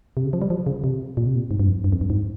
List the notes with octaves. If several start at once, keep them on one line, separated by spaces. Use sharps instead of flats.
C3
C#3
F3
G3
F3
C#3
C3
A#2
C3
A#2
G#2
G2
F2
G2
F2
G2
G#2